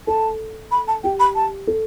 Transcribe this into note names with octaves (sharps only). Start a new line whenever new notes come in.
A4 A5
B5
A5
G4 G5
B5
A5
A4